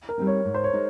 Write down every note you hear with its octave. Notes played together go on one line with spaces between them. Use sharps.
A#4
G3 C4 D#4
C#5
G#2
C5
C#5
G#3 D#4